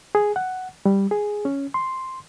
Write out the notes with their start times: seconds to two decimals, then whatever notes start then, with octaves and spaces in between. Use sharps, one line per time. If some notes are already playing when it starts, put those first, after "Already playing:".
0.15 G#4
0.36 F#5
0.86 G3
1.11 G#4
1.45 C#4
1.74 C6